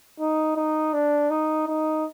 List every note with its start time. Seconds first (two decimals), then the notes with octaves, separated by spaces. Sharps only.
0.20 D#4
0.56 D#4
0.93 D4
1.31 D#4
1.67 D#4